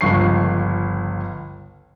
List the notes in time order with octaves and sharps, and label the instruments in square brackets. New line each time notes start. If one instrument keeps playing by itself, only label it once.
[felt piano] G1 C#2 F3 C#6 C7